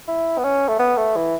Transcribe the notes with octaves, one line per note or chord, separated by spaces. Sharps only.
E4
B3
C#4
A3
B3
A3
E3